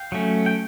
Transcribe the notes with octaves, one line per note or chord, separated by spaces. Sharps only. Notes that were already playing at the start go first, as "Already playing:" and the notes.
Already playing: F5 G5
F#3 A3 C#4
G5